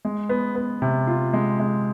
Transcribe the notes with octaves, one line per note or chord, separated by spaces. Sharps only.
G#3
B3
B3
C3
F4
G#3
G#3